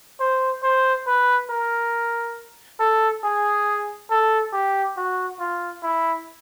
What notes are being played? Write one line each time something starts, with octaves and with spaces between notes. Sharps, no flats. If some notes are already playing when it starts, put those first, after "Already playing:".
C5
C5
B4
A#4
A4
G#4
A4
G4
F#4
F4
E4